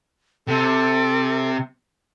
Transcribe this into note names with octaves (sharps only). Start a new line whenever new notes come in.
C3 A4